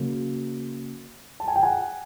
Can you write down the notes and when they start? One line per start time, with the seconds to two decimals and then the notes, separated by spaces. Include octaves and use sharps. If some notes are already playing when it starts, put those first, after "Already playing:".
Already playing: C#3 F#3 A#3
1.40 A5
1.48 G#5
1.56 G5
1.63 F#5 G#5